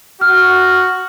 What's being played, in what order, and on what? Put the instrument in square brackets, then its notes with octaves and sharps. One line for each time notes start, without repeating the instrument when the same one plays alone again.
[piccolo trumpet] F#4 [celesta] F6